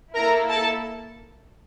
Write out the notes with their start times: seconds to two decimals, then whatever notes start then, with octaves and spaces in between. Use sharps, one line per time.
0.15 A#3 E4 A4 A#4 A#5
0.49 A4 A5